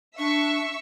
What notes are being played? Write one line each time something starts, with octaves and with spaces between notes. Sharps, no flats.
D4 E5 C#6